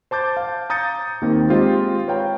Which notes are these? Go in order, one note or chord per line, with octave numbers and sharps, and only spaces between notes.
C5 A5 D6 G6 A6
F5
A#5 D#6 G6 A6 C#7
D#2 D#3 A#3 C4
G#3 C4 F4 G4 C5 D#5
B4 C#5 F5 G5 A#5